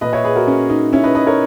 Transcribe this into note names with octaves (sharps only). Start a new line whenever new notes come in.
A#2 B4 D#5
C#5 E5
G#4 B4
F#4 A#4
C#4
D#4
C#4 E4
B4 D#5
B4 D#5
A#4 C#5